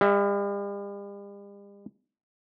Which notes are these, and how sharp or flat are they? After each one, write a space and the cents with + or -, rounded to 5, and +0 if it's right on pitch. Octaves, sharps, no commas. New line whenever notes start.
G3 +45 E5 +0